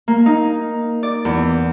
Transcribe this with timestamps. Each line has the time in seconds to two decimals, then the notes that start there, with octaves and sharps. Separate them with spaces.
0.08 A#3
0.26 D#4
1.03 D5
1.25 E2